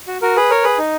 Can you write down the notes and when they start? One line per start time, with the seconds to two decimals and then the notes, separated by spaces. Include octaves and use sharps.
0.07 F#4
0.22 F#4 A#4
0.36 G#4 B4
0.50 A#4 C#5
0.63 G#4 B4
0.78 D#4